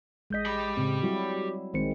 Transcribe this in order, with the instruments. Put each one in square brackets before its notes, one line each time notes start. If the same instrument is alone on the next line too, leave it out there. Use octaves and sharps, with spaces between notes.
[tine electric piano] A1 G6 B6 [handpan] G#3 D#5
[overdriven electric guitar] G4 B5
[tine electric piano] A2 C#3 [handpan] C4
[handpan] F#3 G3 E4 [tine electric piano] F#4
[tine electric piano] A#1 C5 C#7 [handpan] D#3 G#3 C4